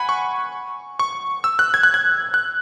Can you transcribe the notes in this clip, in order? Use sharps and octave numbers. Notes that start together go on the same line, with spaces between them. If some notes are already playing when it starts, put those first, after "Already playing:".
Already playing: F#5 G#5 B5
C#6
C#6
E6
F#6
G#6
F#6
G#6
F#6